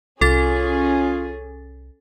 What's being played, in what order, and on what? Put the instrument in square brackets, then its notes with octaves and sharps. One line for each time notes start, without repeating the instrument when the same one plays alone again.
[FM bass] C2 [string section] C#4 G#4 [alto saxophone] F4 [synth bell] A4 A6